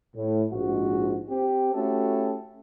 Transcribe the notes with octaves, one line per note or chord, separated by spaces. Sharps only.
A2
A#1 G#2 F#4
C4 G4
A3 C#4 E4 F#4 G4 A4